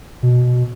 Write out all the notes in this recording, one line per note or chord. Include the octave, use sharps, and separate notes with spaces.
B2